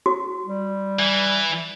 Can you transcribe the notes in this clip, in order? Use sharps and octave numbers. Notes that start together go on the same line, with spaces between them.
F#4
G3
E3